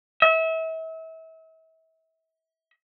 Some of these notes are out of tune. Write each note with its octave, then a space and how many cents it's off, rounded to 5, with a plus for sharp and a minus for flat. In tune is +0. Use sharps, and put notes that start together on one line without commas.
E5 -35